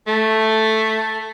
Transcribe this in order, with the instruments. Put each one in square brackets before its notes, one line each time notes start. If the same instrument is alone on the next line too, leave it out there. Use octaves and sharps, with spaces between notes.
[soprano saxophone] A3 [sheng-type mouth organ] A4